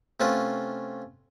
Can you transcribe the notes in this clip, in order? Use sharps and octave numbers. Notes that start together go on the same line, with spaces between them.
C3 A3 C#4 F4 B4